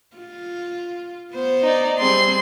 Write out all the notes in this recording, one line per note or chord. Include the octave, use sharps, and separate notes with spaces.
F4
B3 C5
D#4 D5
G3 C4 G#4 C6